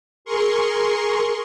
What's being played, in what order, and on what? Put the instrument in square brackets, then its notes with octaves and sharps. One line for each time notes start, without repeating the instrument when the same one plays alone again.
[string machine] G#4 A#4 C6 C#6